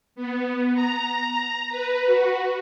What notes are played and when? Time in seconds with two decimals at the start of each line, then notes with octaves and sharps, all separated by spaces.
0.16 B3
0.74 A#5
1.70 B4
2.06 F#4